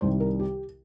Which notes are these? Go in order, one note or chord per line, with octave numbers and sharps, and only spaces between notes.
C2 C3 D#3 G3 C5
A#4
G4